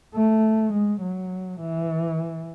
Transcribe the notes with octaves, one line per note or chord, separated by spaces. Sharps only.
A3
G#3
F#3
E3